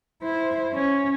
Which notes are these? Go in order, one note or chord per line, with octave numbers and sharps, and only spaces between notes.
E4 C5
C#4